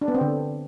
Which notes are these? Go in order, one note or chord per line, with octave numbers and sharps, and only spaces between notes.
D4
B3
C4
D3